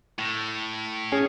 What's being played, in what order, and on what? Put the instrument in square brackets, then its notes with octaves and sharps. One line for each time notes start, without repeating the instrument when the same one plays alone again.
[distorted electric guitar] A2
[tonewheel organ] C#4 G#4